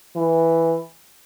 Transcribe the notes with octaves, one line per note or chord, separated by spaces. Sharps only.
E3